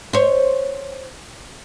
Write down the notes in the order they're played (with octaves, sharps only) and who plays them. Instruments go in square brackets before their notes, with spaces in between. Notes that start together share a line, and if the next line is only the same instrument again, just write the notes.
[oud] C5 C#5